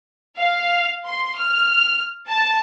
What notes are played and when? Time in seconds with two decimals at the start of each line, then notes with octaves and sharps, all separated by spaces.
0.37 F5
1.06 C6
1.39 F6
2.28 A5